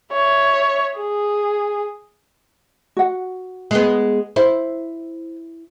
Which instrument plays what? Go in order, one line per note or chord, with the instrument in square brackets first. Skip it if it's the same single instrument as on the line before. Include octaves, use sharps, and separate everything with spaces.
[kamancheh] C#5 E5
G#4
[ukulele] F#4 F#5
[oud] G#3 B3
[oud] E4 [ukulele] C5